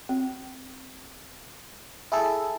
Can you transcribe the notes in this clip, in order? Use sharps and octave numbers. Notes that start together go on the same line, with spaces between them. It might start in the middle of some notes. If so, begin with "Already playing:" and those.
C4
E4 G#4 A4